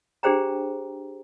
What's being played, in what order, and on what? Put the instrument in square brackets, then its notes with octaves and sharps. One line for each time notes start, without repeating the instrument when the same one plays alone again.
[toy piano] D4 G4 G#4 C5 G5 A#5